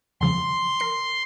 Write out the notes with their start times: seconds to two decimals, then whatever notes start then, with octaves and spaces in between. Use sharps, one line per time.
0.21 E2 C#3 F3 C6
0.80 A#4 C7